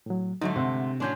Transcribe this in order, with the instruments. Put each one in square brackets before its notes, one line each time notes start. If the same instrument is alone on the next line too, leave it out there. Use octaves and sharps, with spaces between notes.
[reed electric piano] A2 F#3
[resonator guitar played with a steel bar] G#2 D3 A3 [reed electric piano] F#3 D#4
[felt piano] C3 [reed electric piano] E5 F#5 C6
[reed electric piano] A2 C6 G6 [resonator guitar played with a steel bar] F#3 C#4 D4